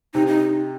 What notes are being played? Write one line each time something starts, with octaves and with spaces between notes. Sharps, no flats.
C3 D#4
D#4